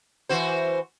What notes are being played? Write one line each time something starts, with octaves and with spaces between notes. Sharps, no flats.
E3 F#4 C5